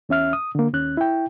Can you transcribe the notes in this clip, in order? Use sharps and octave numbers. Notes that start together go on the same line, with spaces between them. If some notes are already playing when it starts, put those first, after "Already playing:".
E2 C#4 E5 F6
D#6
D3 A#3
D#2 C#4 F#6
E4 G5